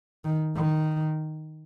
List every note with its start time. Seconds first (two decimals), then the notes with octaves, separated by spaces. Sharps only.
0.25 D#3
0.56 D#3